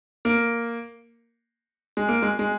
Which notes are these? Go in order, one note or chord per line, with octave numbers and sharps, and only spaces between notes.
A#3
G#3
A#3
G#3
G#3